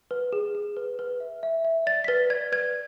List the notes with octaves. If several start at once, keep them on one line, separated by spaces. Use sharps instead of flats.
B4
G#4
G#4
B4
B4
E5
E5
E5
D5 A6
B6
B4 A6
D5 G#6
B4 G#6